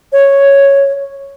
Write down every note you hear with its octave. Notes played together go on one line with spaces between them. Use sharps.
C#5